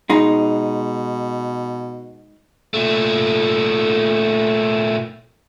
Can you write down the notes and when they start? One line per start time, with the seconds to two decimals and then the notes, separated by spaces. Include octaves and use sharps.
0.10 B2 G#3 D#4
2.74 A#2 A3